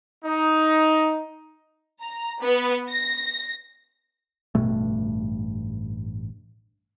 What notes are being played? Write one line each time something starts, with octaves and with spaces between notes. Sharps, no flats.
D#4
A#5
B3
A#6
A1 G2 B2 A3